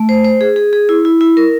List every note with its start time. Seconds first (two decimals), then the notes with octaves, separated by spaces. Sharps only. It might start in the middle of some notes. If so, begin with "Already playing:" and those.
Already playing: A3
0.09 C5
0.25 C5
0.41 G#4
0.56 G#4
0.73 G#4
0.89 E4
1.05 E4
1.21 E4
1.37 A#4